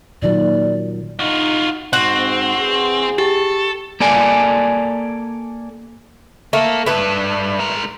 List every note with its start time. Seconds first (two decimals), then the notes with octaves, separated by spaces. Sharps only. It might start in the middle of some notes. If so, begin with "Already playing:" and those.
0.22 A#2 D#3 F#3 D5
1.20 D#4 F4 F#4
1.93 G#2 C4 F#4
2.56 E2 G#4
3.18 G4 A4
4.00 A#3 A4 D5 G#5
6.53 A3 A#3
6.86 G2 A3 B4
7.60 G#3 A#4